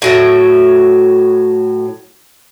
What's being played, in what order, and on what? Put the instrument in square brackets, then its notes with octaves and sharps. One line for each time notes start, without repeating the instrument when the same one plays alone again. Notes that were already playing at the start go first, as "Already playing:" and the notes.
[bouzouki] A2 F#3 E5